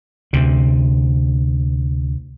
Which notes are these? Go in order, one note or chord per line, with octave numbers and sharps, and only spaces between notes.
D2 C3